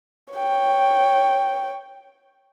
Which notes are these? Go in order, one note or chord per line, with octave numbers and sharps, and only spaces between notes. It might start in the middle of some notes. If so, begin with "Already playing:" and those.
C#5 G5